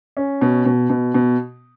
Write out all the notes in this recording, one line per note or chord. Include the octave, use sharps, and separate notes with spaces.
C#4
B2
B2
B2
B2